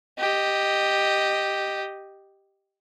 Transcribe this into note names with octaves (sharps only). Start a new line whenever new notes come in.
G4 D#5